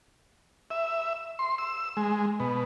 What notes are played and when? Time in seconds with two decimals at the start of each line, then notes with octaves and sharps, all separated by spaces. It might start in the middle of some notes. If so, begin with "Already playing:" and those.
0.70 E5
1.39 C6
1.58 E6
1.97 G#3
2.40 B2